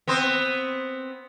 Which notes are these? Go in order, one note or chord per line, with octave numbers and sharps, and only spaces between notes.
B3 C4 C5